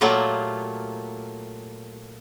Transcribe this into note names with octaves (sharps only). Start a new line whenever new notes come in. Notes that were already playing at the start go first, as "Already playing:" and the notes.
A#2 F#3 A3 A#3 F4 G4